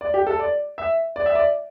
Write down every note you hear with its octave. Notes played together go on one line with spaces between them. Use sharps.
D5
G4
A4
D5
E5
D5
E5
D5